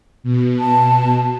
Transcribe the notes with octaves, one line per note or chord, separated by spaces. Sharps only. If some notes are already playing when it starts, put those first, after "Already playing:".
B2
A5